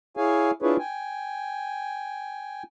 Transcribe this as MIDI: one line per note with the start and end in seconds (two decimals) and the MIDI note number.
0.17 0.51 64
0.17 0.51 68
0.17 0.51 73
0.17 0.51 77
0.17 0.51 80
0.62 0.77 62
0.62 0.77 64
0.62 0.77 65
0.62 0.77 68
0.62 0.77 71
0.62 0.77 73
0.79 2.63 79
0.79 2.63 80